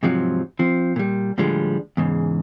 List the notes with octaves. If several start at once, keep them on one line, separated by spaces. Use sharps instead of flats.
G#2 C3 F3 F#3
F3 C4
A#2 G3
A2 D3 F3 G3 G#3
E2 G#2 C#3